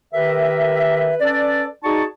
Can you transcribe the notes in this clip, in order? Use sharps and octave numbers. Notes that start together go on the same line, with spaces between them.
D#3 G4 A#4 B4 E5
C#4 A4 B4 D5
D#4 F#4 G#4 D5 A5 C#6